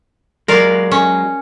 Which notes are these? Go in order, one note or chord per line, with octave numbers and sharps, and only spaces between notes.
F#3 G#3 A#4 D5 F5
C#4